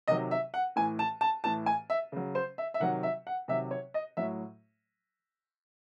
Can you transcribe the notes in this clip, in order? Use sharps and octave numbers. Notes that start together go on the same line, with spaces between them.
C3 D#3 F#3 D#5
E5
F#5
A2 E3 G#5
A5
A5
A2 E3 A5
G#5
E5
C#3 F#3
C5
E5
E5
C3 D#3 F#3 F#5
E5
F#5
C3 D#3 F#3 E5
C#5
D#5
A2 F#3 E5